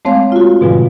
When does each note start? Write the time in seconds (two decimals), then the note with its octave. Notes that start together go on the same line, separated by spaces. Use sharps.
0.05 G#3 A3 C4 C#5 F5
0.32 F4 F#4
0.61 G#2 B2 D3 F3 G3 G#3